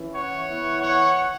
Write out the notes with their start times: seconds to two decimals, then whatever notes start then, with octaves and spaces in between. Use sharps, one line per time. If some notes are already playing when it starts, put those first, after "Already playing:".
Already playing: E3 C#4 E4
0.14 C#5 F#5
0.48 E3 B3 E4
0.82 C#5 F#5